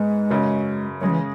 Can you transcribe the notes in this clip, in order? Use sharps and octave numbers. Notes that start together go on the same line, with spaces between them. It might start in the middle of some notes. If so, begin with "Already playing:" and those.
Already playing: G#2 G#3 B3
F#2 C#3 F#3
C#3 F#3 G#3 C#4
E3